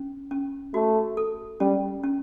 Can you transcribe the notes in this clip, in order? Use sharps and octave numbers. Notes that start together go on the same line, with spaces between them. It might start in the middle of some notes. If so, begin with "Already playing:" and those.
Already playing: C#4
C#4
A3 F#4
A4
G3 C#4
C#4